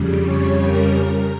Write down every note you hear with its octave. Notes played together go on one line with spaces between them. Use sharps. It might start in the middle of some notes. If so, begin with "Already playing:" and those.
Already playing: F2 C#3 G3
C#5
A#4